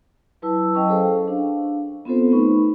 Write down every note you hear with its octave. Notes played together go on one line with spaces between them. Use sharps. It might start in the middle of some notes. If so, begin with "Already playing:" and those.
F#3 E4 B4 A5 E6
F#3 C#4 D#5 G5 A5 C#6
G#4 A4 C5 F5
D4 F5
B3 C4 F4 A4 C5
A3 D#4 B4 B5 C#6